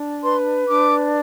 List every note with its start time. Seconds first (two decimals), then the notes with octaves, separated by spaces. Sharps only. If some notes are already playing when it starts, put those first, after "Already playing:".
Already playing: D4
0.23 B4 C6
0.67 D4 D6